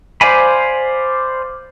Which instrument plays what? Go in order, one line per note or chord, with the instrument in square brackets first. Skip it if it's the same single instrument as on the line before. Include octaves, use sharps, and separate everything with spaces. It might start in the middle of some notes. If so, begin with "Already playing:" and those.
[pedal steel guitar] C5 D5 F5 G#5 B5